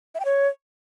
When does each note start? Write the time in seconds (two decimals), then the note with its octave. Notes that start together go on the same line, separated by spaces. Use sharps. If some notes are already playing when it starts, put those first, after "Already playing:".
0.15 E5
0.20 G5
0.25 C#5